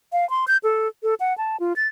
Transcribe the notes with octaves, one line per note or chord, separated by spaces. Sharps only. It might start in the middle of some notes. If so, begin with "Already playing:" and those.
F5
C6
G6
A4
A4
F#5
A5
F4
A6